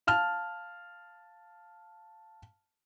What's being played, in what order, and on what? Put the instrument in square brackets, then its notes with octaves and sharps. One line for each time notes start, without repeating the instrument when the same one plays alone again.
[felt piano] F5 A5 F6